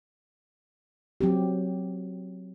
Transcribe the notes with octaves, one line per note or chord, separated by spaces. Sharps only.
F#3 C4 G4